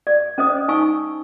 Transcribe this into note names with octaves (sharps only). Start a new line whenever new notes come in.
D5
C#4 C5 D#5 D#6
D#4 G#5 C#6 E6